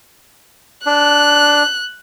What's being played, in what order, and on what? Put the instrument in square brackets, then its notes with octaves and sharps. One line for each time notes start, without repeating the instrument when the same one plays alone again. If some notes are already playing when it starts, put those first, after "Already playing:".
[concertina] D4 [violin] F#6